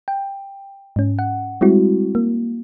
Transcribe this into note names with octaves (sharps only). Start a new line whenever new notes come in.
G5
G#2 C#4
F#5
G3 G#3 C4 E4 F#4
A#3